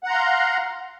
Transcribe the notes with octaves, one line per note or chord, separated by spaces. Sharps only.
F5 F#5 A#5 C6